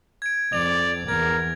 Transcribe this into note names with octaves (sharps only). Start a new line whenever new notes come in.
G#6 D7
F2 D5 F7
E2 A#4 G#6